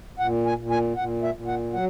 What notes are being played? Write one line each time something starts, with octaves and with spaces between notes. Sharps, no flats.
A#2 F#5
G#5
A#2
G#5
A#2 F#5
E5
A#2
F#5
F#3 F#5